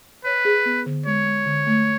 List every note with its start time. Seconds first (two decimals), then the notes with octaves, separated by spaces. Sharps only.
0.25 B4 C#5
0.45 G#4
0.66 B3
0.86 D3
1.06 G#3 C#5
1.26 G#3
1.46 D3
1.67 A3